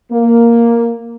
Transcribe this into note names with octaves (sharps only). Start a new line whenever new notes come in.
A#3